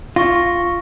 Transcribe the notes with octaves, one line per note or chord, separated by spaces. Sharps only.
F4 C#6 A#6